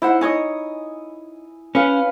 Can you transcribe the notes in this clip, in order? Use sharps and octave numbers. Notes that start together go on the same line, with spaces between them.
D#4 E4 C5 F#5
D#4 C#5 D#5 G#5 D#6
C#4 B4 F5 G#5